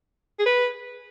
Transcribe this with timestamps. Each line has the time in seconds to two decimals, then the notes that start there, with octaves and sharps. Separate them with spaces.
0.39 G#4
0.46 B4